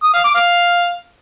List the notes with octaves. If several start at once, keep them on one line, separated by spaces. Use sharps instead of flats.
D#6
F5
D6
F5